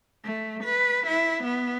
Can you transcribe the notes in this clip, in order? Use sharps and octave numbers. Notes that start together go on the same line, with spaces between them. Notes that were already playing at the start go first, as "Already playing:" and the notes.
A3
B4
E4
B3